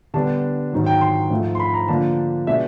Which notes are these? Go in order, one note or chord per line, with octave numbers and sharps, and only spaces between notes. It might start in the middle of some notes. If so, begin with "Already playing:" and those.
D3 G3 B3 D4 A5
G#2 D#3 F#3
G5
C6
G#2 F3 A3
C6
B5
A#5
D3 F3 A#3 D4 A5
B2 G#3 B3 D4 E5